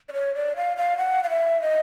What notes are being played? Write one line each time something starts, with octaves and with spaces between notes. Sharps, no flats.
D5
C#5
D5
F5
F5
F#5
F5
E5
D#5